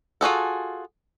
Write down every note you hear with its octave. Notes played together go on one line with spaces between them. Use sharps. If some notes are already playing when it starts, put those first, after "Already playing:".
F4 F#4 G#4 A4